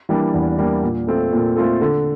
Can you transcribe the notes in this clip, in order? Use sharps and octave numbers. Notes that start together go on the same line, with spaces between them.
E3 G3 A#3 D4
E2
E3 G3 A#3 D4
A#2
A3 C4 F4 A4
A#2
A3 C4 F4 A4
D3